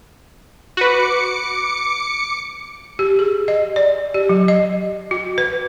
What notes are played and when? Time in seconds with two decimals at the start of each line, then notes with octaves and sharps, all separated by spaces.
0.77 F#4 B4 D6 C#7
2.99 G4
3.19 G#4
3.48 D#5
3.76 D5
4.14 G4
4.29 F#3
4.48 D#5
5.11 F#4
5.38 B4